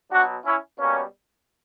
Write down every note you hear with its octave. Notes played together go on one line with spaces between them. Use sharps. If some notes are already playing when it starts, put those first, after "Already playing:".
B2 F#3 D4 F#4
C#4 E4
B2 G3 A#3 C#4